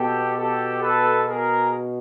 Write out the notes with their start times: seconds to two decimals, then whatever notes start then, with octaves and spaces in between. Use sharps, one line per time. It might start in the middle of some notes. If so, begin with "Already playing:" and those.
Already playing: B2 G4 A4
0.36 G4 A4
0.82 A4 B4
1.28 G#4 A#4